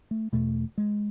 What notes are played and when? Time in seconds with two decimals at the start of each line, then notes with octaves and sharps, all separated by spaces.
0.11 A3
0.33 E2 B2 A3
0.78 G#3